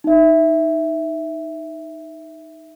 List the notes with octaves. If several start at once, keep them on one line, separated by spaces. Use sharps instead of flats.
D#4 E5